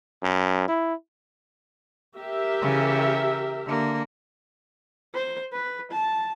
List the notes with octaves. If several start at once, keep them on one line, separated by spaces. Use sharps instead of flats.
F#2
E4
G4 A#4 E5
C#3 E3
D3 A#3
C5
B4
A5